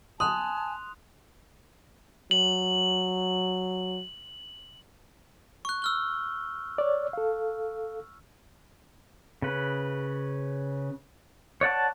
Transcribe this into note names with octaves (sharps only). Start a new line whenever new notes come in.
G#5 A5 C6 D#6 F#6 F7
F#3 F#7
C#6 F#6
E6 F6 G7
C#5 D5
A4 F5
C#3 B4
C#5 D5 F#5 A5